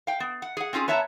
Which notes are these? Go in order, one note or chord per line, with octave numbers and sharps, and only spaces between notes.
F5 G5
B3
F#5
G#4 F#5
C4 C#4 F4 F#4 G#4
B3 C#5 E5 A5 A#5